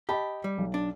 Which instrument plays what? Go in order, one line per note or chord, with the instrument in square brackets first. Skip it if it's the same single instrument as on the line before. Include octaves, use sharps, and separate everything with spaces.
[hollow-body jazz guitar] G4 [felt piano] D#5 A5 B5
[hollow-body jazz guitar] G3
[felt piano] B1
[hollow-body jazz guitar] D4